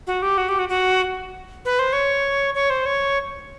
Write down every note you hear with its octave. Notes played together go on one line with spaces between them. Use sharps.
F#4
G4
F#4
G4
F#4
F#4
B4
C5
C#5
C#5
C5
C#5